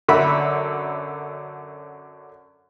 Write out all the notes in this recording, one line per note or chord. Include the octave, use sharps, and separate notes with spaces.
F#2 D3 E5 B5